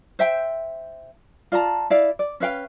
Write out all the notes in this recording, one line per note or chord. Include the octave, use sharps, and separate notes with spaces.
C5 E5 G5
F4 D5 A5 A#5
E4 D5 F5
D5
C#4 B4 F5 G5